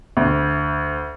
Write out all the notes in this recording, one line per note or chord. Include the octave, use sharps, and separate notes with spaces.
D2